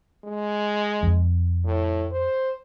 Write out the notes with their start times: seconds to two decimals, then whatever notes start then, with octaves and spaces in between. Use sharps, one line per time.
0.25 G#3
1.03 F2
1.65 A2
2.11 C5